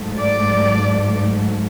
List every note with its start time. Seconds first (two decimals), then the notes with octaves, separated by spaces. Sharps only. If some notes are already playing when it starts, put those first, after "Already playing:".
Already playing: G#2 F#3 A3
0.18 D5